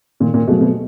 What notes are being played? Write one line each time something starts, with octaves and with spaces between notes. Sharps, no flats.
A#2 D#3
A#2
B2 F#3 A3 C4
B2